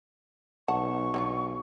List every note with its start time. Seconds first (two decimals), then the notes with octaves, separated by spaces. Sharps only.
0.68 B1 F#5 A5 C#6
1.14 B1 D3 C#4 F4